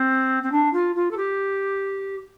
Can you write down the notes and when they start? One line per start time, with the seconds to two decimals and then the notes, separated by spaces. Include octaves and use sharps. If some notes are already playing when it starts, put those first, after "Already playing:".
Already playing: C4
0.43 C4
0.51 D4
0.73 F4
0.95 F4
1.11 A4
1.17 G4